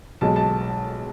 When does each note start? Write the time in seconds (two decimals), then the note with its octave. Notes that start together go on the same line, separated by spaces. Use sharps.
0.21 B1 B2 G#3 A5
0.36 A5